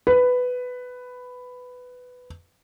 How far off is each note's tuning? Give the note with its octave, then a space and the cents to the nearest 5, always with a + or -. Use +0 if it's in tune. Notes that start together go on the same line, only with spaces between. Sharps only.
B4 +10